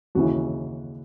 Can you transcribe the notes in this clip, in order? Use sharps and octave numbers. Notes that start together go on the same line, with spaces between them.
D#2 C#3 E3 F#4